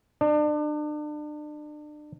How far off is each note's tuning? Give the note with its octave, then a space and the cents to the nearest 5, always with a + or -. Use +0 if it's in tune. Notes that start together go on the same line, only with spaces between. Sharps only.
D4 +35